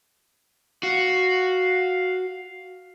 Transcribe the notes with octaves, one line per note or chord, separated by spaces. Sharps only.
F#4 F5